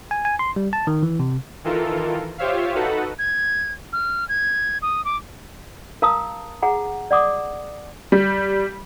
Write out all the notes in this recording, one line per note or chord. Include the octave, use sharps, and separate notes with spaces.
G#5
G#5
C6
G3
A5
D#3
E3
C3
D#3 E3 F4 A4 A#4
F4 G4 C5 C#5 E5 F5
D#4 F#4 A4 B4 F#5
G#6
F6
G#6
D#6
D6
A#4 F5 A5 A#5 D#6
G#4 F#5 A#5
D5 F#5 D6 D#6
G3